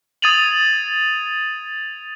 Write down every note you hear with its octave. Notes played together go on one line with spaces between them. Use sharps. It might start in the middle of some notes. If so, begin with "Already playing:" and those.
D#6 G#6 A6 D#7 F7 F#7